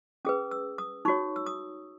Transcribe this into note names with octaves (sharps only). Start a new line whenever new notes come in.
C#4 G#4 B4 D#6
E6
D#6
D#4 F#4 C#5 C#6
E6
D#6